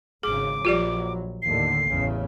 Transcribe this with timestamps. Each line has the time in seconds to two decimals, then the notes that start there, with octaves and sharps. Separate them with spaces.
0.23 G#1 C#3 G#4 D6
0.65 A#1 F#3 F4 G4 D5
1.42 D#2 A2 D3 C7
1.88 A1 E2 C#3